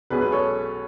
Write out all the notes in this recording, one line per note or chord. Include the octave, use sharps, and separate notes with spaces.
B1 B2 G#3 G#4 B4
G#4 B4
A4 C#5